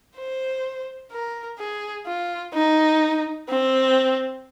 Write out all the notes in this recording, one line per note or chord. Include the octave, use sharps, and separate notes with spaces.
C5
A#4
G#4
F4
D#4
C4